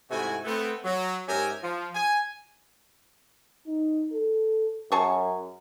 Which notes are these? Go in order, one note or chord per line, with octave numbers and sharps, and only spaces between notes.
G#2 C3 A3 E4 F#4 G#5
A3 B3 C4
F#3
G#2 C#4 G4 A#4 E5 G#5
F3
G#5
D#4
A4
F#2 G#4 A5 C#6